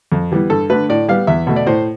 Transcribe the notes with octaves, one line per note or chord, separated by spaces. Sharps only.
F2
E3 G3 B3
G2 A4
D3 A3 B4
A2 D5
G3 B3 F5
E2 E5
B2 A3
D5
A2 C5